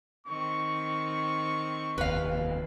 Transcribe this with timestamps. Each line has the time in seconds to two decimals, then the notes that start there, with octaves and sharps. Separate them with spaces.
0.27 D#3 C4 C#6
1.98 F1 D#2 B4 F5